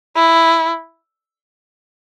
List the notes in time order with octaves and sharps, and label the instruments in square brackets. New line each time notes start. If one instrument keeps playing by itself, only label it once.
[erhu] E4